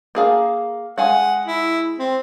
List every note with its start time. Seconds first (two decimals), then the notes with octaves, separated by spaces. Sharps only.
0.15 A#3 G#4 F5
0.98 G#3 F5 F#5 G#5
1.46 E4
1.99 C4